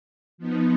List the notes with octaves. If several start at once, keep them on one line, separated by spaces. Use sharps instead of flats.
F3 B3 D#4